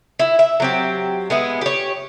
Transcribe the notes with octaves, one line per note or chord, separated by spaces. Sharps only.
E4
E5
F#3 C4 G4
G#3 B3 E4
G4 C#5